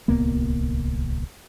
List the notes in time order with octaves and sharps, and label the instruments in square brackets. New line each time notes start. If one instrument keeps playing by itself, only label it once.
[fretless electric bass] D1 C2 A#3 B3